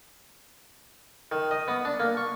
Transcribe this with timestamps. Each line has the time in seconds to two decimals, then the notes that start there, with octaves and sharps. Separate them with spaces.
1.32 D#3
1.51 D#5
1.68 B3
1.85 D4
2.00 A#3
2.17 C#6